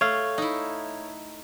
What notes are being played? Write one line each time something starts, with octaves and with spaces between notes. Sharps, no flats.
A3 C#5 F5
D#4 E4